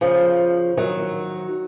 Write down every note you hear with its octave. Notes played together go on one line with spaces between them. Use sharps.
C#3 F3
D#3 F#3